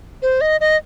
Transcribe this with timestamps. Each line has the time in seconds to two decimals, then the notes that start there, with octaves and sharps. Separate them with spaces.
0.22 C5
0.41 D#5
0.61 D#5